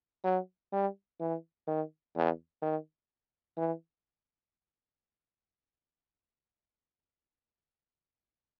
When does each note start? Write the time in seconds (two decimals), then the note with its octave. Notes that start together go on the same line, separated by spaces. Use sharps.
0.24 F#3
0.72 G3
1.20 E3
1.67 D#3
2.16 E2
2.62 D#3
3.57 E3